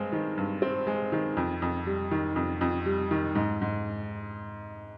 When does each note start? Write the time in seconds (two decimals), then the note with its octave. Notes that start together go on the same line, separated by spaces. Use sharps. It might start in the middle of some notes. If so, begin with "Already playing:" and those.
Already playing: G2 G#3 C4
0.12 D#3
0.38 G2
0.62 C4
0.87 G#3
1.12 D#3
1.37 F2
1.62 F2
1.86 G3
2.11 D#3
2.36 F2
2.61 F2
2.86 G3
3.11 D#3
3.35 G#2
3.61 G#2